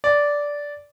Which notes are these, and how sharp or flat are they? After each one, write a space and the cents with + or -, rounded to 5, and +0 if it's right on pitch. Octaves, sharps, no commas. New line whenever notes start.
D5 -10